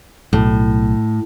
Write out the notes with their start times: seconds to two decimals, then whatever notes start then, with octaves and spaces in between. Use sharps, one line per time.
0.33 B1 A2